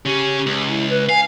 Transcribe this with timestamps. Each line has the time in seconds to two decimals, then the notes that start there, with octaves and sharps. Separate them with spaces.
0.05 C#3 C#4 G4
0.46 C#2
0.68 E4
0.90 B4
1.09 F5 G#5